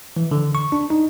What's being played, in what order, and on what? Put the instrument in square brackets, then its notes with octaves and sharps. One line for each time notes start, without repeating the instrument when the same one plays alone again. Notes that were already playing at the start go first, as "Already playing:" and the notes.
[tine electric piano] E3
D3
C#6
D4
D#4